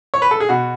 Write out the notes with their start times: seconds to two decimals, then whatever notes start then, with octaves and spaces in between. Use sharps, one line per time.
0.14 C#5
0.22 B4
0.31 A4
0.40 G#4
0.49 B2 F#4